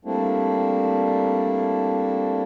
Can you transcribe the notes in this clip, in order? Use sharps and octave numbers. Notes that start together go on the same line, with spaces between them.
G3 A3 A#3 C4 D4 E4